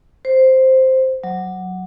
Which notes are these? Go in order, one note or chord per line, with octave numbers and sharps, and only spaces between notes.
C5
F#3